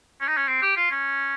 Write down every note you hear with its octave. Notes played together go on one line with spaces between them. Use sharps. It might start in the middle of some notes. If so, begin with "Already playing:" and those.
C#4
D#4
C#4
C4
G4
F4
C#4